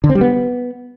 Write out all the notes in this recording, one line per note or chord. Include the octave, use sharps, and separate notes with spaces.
D3
C4
G3
B3